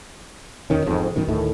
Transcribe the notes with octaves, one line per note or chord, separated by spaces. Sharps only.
E2 B2 D#3 C#4
E1 F2 G#2
F#2 B2 D#3
D2 A2 D#3 A3